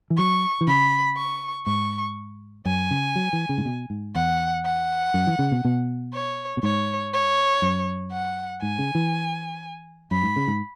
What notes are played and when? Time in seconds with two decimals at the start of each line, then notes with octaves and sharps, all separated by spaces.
0.10 E3
0.17 F#3 C#6
0.61 E3
0.67 C#3 B5
1.17 C#6
1.66 G#2 C#6
2.65 F#2 G#5
2.91 C#3
3.16 F#3
3.33 E3
3.49 C#3
3.58 G#2
3.65 B2
3.90 G#2
4.15 E2 F#5
4.65 F#5
5.14 F#2
5.27 E3
5.39 C#3
5.52 B2
5.65 B2
6.13 C#5
6.57 B2
6.63 G#2 C#5
7.13 C#5
7.62 F#2
8.12 F#5
8.62 G#2 G#5
8.79 C#3
8.95 E3
10.11 F#2 B5
10.23 G#2
10.36 C#3
10.47 G#2